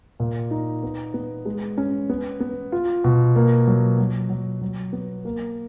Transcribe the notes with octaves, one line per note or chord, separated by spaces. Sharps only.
A#2
D#4
B3
B3
G#3
C#4
B3
B3
F4
B2
A#3
F#3
F#3
F#3
F#3
B3
A#3